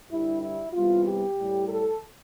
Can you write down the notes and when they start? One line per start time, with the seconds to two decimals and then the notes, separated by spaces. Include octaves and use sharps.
0.10 G2 D3 G3 E4
0.42 E4
0.73 E2 C3 E3 G3 F4
1.05 G4
1.37 A2 G3
1.68 A4